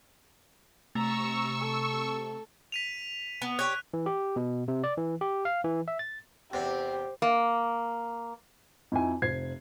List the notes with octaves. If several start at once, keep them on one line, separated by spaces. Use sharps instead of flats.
C3 A3 A#5 C#6 E6
A4
B6 D#7 F7
B3
G4 C#5 F#6
E3
G4
B2
C3
D5
E3
G4
F5
E3
E5
A6
E2 C3 C4 G4
A#3
F2 D#4 E4 G#5
F1 C5 G#6 C7